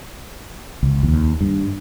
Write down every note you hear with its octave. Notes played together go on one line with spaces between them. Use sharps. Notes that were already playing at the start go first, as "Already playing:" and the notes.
C#2
D#2
G2